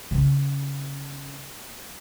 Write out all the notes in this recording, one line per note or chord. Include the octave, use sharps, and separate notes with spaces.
C#3 C#4